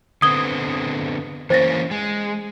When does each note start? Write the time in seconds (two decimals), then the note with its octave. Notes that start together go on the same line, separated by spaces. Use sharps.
0.22 D3 B3 C4 D#6 G#6 G7
1.50 E3 A#3 C#4 C5 A6 A#6
1.91 G#3